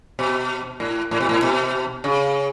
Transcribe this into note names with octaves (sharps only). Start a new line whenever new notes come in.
B2
A2
A2
B2
A2
B2
C#3